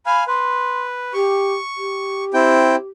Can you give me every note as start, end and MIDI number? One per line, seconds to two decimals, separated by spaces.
0.06 0.24 77
0.06 0.24 80
0.06 0.25 83
0.27 1.13 71
0.27 0.81 84
1.13 1.54 67
1.13 2.24 85
1.77 2.88 67
2.34 2.76 60
2.34 2.76 64
2.34 2.76 79